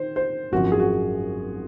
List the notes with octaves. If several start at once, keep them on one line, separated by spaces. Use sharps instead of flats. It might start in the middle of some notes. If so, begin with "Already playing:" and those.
Already playing: D#3 C5
C5
G#1 F#2 F3 F#4
G#4
F#4